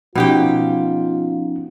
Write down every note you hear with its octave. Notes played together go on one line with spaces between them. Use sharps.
B2 F3 C#4 D#4 F4 G4 G5